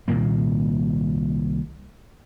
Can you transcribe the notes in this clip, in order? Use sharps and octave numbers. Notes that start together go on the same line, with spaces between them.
C2 A#2 D#3 A#3